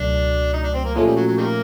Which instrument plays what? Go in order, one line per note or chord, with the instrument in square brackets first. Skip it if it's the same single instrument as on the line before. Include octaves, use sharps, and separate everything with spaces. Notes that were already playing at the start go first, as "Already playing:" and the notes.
Already playing: [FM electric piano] C#2 B2 F#3 A3 [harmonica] D4
[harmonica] D#4
D4
C4
A#3
[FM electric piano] A#2 F3 A3 C#4 [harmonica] G#3
[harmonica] G3
F#3
F#3
D#3 G3 A#3